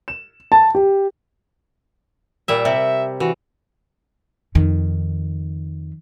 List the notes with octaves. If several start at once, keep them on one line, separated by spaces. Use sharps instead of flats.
E7
A5
G4
A#2 G3 E5
C3 E5
E3 F#4
F2 D#3